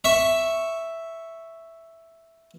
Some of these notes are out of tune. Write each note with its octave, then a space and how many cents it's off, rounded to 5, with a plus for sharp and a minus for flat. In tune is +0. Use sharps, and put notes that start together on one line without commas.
E5 +0 C#6 +0